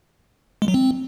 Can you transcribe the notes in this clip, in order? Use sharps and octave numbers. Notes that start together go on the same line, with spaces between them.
G#3
F#3
C4